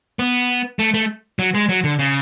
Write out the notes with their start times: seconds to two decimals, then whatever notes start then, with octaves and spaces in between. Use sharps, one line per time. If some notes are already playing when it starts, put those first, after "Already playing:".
0.19 B3
0.79 A3
0.94 A3
1.39 F#3
1.54 G#3
1.69 F#3
1.84 D3
1.99 C#3